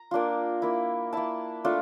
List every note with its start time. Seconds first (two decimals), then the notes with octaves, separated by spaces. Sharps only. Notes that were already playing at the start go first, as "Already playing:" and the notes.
Already playing: A#5
0.11 A#3 D4 F4
0.62 A#3 E4
1.13 A#3 E4 A5
1.64 A3 D4 F4